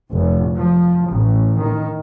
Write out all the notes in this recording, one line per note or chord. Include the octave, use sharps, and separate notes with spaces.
F1
F3
A1
D#3